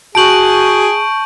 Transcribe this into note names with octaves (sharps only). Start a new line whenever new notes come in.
F#4 G#4 A5 C#6 G6 D7 F#7